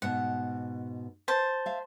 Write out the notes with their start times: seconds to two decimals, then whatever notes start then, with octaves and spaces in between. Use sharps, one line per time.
0.02 G#2 B2 F#5
1.28 C5 A5
1.66 E5 F5